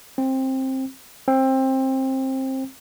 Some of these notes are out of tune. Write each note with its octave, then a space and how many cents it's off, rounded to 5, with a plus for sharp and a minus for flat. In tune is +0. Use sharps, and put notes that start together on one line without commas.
C4 +15
C4 +20